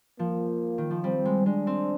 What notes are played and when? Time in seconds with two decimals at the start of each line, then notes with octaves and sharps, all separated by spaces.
0.19 F3 A#3
0.78 D#3
0.91 F3
1.04 G3 C4
1.25 G#3
1.46 G#3 D4
1.67 C4